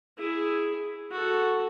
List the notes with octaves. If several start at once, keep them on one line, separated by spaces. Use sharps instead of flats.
E4 G#4
F#4 A4